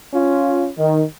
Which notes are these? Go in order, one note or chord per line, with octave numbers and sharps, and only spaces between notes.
C#4 F4
D#3